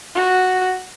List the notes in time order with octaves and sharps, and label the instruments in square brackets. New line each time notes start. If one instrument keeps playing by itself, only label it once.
[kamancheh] F#4